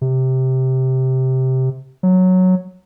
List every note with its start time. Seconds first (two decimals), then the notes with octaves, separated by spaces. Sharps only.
0.01 C3
2.03 F#3